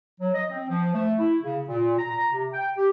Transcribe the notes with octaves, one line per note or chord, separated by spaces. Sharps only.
F#3
D#5
C4
F3
A3
E4
C#3
A#2
A#5
C3
G5
G4